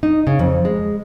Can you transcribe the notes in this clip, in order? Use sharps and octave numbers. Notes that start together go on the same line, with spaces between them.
D#4
C#3
F2
G#3